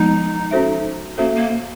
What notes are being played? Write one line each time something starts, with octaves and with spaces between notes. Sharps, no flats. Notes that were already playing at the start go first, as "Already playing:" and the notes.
Already playing: F3 G#3 B3 D#4
C#4 F#4 A4 C5 E5
A#3 C#4 F#4 A4 C5 E5
A#3